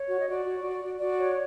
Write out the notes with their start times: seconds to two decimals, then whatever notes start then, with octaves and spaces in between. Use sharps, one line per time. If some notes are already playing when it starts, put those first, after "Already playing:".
Already playing: C#5
0.09 F#4
0.19 D#5
0.27 F#4 D5
0.45 F#4
0.63 F#4
0.83 F#4
1.00 F#4 D5
1.19 C#5